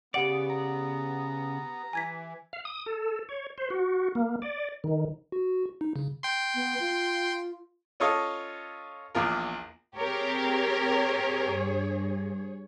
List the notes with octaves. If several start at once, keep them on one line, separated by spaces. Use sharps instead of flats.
C#3 B3 G4 D5 F#5 D7
A#5
E3 G#5 G#6 B6
F5
D#6
A4
C#5
C5
F#4
A#3
D5
D#3
F#4
D#4
C#3
G5 C6
B3
F4
C#4 F4 A4 C#5 D#5 F5
A#1 E2 F4 A#4
C4 G4 G#4 A#4 C#5
G2